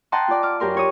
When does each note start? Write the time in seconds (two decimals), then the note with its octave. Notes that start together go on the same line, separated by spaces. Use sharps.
0.12 D#5 F#5 G5 A5 A#5 C6
0.28 F4 D5
0.43 D6 F6
0.60 F#2 G4 A#4 C6
0.74 F4 C#5 D#6